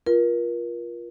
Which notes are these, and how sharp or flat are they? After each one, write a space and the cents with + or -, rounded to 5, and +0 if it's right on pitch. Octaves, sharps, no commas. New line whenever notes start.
F4 +0 A#4 +35